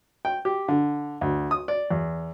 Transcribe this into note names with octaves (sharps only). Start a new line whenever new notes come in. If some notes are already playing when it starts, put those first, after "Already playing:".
G5
G4
D3
D2
D#6
D5
E2